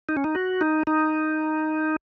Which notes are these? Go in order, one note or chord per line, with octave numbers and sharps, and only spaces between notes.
D#4
C#4
D#4
F#4
D#4
D#4